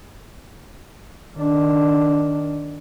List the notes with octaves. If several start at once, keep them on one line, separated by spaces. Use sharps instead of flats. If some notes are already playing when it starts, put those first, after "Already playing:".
D#3 D4